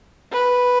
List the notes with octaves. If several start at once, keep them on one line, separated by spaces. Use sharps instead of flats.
B4